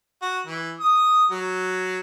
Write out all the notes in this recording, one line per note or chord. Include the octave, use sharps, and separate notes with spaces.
F#4
E3
D#6
F#3